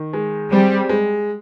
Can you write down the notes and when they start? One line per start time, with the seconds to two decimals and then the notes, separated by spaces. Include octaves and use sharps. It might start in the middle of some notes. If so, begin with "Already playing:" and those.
Already playing: D#3
0.13 G#3
0.51 G3 C4
0.89 G#3